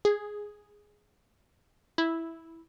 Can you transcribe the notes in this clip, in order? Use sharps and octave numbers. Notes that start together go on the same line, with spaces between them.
G#4
E4